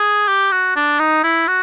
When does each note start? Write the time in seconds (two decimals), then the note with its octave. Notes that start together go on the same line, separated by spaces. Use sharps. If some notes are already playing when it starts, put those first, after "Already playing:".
Already playing: G#4
0.28 G4
0.52 F#4
0.76 D4
0.99 D#4
1.24 E4
1.48 F#4